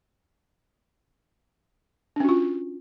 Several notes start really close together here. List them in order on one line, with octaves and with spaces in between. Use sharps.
D4 C#4 F#4 F4